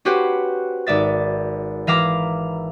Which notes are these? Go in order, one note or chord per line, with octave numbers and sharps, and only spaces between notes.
C#4 F#4 G4 B4 C5
G#1 D5 E5 A6
E3 E5 F5 A#5 D6